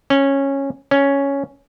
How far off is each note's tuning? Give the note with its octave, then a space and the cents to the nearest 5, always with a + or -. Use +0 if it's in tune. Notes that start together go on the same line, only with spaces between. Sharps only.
C#4 -10
C#4 +5